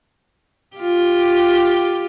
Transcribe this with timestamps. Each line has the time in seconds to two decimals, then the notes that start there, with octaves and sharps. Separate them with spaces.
0.77 F4 G4